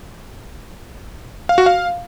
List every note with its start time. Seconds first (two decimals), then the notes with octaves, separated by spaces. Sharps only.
1.49 F5
1.58 F#4
1.66 F5